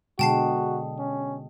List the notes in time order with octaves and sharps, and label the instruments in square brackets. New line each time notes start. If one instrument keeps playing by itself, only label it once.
[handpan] B2 D3 G#3 [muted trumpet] F#4 [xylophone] G5 A5 C7
[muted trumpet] C#4